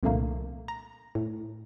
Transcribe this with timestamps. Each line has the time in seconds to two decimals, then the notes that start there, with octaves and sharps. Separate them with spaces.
0.03 C2 F2 A#2 D3 A3 A#3
0.68 A#5
1.15 A2